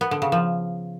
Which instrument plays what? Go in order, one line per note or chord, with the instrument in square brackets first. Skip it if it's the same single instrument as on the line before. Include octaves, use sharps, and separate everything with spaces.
[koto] B3
D3
C#3
F3